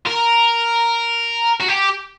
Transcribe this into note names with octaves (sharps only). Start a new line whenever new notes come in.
A#4
F#4
G4